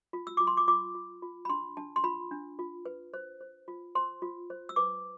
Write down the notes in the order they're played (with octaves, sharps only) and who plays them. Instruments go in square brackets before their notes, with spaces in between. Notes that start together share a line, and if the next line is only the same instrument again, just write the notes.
[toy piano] F4
E6
F4 D6
C6
D6
F4 D6
F4
F4
B5
D4 C6
D4 A5
C6
F4 B5
D4
F4
B4
C5
C5
F4
C5 C6
F4
C5
E6
B4 D6